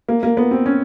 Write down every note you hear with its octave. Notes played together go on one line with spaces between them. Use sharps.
A#3
A#3
B3
C4
C#4